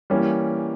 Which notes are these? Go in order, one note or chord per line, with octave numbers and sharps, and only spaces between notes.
E3 G3 A#3 C#4